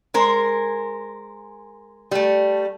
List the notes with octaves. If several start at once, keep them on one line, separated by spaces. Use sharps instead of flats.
G#3 A#4 C5
G3 A3